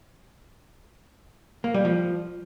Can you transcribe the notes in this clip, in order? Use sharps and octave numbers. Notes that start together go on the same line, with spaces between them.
A#3
G3
F3